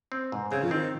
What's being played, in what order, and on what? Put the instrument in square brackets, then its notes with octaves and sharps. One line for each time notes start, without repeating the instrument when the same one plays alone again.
[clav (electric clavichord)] C4
G#2
[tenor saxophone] C#3 [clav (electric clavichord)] C4
[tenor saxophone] F3
[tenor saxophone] D#3 [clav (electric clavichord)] C4